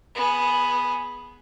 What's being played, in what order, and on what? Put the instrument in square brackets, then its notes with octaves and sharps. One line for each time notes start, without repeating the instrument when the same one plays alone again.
[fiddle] B3 G#4